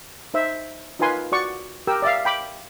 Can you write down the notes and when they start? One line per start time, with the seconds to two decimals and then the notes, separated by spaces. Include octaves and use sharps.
0.34 D#4 C5 E5
0.99 D#4 F4 A#4 B4 G#5 C6
1.32 F#4 D5 C#6
1.87 G4 A#4 G5 E6
2.02 D5 E5 F5
2.25 G5 B5 D6